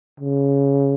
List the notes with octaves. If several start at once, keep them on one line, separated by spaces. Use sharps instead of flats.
C#3